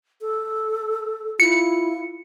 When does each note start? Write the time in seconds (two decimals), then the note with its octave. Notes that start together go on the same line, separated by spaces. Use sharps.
0.21 A4
1.40 E4 F4 C#7